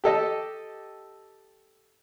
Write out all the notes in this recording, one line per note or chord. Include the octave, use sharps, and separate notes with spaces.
G4 A4 D#5